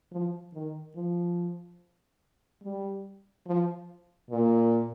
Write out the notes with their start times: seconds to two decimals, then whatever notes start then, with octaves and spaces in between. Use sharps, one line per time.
0.12 F3
0.54 D#3
0.96 F3
2.63 G3
3.47 F3
4.31 A#2